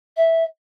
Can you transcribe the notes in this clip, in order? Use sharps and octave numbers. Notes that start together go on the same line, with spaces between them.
E5